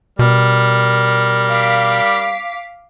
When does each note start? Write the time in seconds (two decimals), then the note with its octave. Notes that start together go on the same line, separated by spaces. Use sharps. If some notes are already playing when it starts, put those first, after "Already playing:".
0.19 B2 G3 A#4
1.50 F5 D6 B6